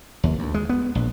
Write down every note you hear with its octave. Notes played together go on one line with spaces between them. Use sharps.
D#2
D2
G#3
B3
A#1